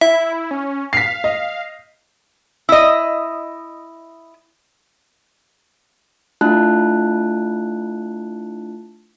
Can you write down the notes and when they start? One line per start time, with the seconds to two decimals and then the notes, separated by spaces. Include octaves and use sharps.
0.01 E4 E5
0.51 C#4
0.93 F5 B6 C7
1.24 D#5
2.69 E4 D#5
6.41 A3 D4 E4 F4 A5 F#6